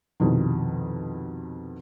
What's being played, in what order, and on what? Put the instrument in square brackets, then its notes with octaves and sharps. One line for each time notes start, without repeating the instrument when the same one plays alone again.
[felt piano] C2 F2 B2 D#3